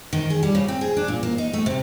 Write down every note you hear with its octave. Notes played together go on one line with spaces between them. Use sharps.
D#3
G#4
G3
C#3
C4
G#4
D4
A#2
A#3
D#4
A3
C3